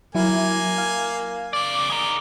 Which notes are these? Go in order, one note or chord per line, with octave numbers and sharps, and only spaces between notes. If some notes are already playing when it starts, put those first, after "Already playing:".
F#3 A#3 E4 G#5
F5
C#3 D5 D6
G#4 A#4